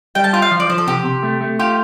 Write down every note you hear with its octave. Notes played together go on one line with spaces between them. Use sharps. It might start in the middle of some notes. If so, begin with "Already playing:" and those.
G3 G5
A5
F4 G5
F5
F3
D5
F3 C5
A4
C3 G4
C3
A3
A3
F4 G4